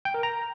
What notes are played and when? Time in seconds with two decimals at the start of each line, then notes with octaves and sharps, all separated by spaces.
0.05 G5
0.14 A#4
0.23 A#5